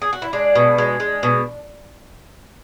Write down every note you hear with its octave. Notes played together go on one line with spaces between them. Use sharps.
G#4
F#4
E4
G#3 D4
B2
G#3
G#3
B2